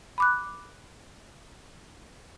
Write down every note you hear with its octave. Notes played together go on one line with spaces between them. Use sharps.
B5 D6 F#6